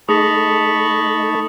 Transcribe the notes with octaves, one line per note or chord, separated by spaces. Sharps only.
A3 D#4 G#4 A5 B5 C#6 D#6 A#6